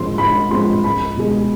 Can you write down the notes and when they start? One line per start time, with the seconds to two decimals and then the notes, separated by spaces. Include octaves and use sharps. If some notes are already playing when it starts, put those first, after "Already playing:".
Already playing: G#2 F3 G#3 C4 C6
0.18 G#2 B5
0.51 F3 G#3 C4 C6
0.84 C#2 B5
1.17 B2 G#3